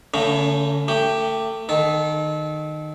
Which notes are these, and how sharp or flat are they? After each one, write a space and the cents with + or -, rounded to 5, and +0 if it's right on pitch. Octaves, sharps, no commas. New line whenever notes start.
D3 -35 A3 +30 C#4 +25
A3 +30 G4 +0
D#3 -20 A4 -30